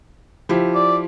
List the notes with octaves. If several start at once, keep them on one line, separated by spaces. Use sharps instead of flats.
F3 E4 G4
D5